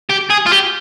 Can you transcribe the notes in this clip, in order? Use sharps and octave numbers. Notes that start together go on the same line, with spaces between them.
G4
G#4
F4
G4